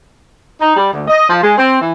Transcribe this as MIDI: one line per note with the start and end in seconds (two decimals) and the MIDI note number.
0.59 0.73 63
0.76 0.90 55
0.93 1.03 38
1.08 1.29 75
1.29 1.41 53
1.43 1.54 56
1.57 1.79 60
1.80 1.92 52